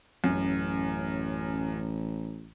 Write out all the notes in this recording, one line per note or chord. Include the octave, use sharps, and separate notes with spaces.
A1 F#2